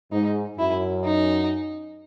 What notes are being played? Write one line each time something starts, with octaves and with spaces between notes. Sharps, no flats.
G#2 D#4
F#2 E4
D#4